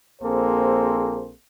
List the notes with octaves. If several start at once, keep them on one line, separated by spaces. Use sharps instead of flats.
A#1 A#3 C4 G#4 A4 C5